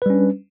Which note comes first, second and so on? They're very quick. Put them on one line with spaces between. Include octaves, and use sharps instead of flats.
B4 G3 C#4 D4